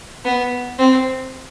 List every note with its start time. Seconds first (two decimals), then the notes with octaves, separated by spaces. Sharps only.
0.25 B3
0.79 C4